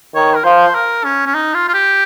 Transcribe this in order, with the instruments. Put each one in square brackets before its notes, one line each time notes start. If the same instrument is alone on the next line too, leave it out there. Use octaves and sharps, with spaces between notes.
[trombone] D#3 [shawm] C#5
[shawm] A#4
[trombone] F3 [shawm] C5
[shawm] A#4
C#4
C#4
D#4
F4
F4
G4